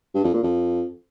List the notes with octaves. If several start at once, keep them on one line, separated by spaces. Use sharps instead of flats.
G2
F2
A#2
F2